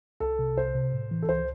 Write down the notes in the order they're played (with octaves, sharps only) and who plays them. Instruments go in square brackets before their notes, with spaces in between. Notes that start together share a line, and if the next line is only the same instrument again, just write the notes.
[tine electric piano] C2 [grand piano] A4
[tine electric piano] C3
[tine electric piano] C2 [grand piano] C5
[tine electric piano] C3
A2
E3
[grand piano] A4
[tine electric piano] C#2 [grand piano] C5